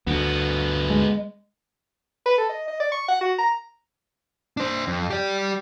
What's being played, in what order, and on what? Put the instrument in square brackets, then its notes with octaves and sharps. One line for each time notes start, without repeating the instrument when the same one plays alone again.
[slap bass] D2 [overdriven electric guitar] D3 B3
[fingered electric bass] G#3
[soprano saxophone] B4
A4
D#5
D#5
D5
C#6
F#5
F#4
A#5
[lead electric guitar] D4 C5
F2
G4 D5